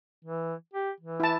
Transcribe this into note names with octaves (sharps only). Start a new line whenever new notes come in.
E3
G4
E3
E4 A5